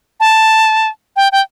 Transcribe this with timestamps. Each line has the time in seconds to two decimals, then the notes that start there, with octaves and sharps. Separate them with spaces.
0.20 A5
1.16 G5
1.32 G5